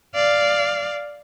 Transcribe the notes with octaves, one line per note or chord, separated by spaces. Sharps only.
D5 F5